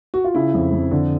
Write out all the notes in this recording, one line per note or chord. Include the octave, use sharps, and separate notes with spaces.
F#4
F4
C#3 E4
F2
F2
D3